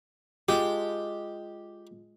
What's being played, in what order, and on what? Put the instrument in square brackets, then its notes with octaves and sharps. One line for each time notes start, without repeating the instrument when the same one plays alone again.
[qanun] G#3 F4 A5 [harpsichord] G4